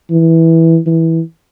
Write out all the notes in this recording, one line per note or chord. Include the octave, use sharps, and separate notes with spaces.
E3
E3